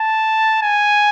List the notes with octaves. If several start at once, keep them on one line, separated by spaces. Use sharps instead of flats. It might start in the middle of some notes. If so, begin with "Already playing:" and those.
Already playing: A5
G#5